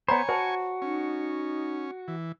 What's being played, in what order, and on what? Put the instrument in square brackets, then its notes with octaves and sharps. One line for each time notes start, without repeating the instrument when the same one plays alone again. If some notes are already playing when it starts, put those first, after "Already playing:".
[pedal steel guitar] B3 C5 [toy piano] C#5 A#5 B5 [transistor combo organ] G#5 C#6
[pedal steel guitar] F#4 [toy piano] C5 A5
[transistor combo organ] C#4 [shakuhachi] D#4
[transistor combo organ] E3